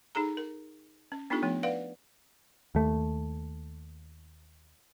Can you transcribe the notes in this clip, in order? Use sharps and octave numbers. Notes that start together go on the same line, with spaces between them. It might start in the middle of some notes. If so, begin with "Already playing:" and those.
D#4 G#4 A4 A#5
A#4
C#4
B3 D4 D#4 F4 G4 A4
F3 A3 B3
B4 D5 F5 F#5
D#2 A3